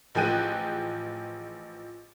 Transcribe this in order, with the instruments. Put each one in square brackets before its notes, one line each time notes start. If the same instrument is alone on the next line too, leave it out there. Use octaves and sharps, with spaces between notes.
[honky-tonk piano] A1 F3 G#4 G5 F#6 D#7